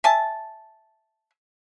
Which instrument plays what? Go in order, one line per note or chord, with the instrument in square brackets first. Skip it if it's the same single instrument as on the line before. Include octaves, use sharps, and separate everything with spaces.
[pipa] E5 G#5 A5